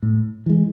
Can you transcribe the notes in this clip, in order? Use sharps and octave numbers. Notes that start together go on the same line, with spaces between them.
A2
E3 G#3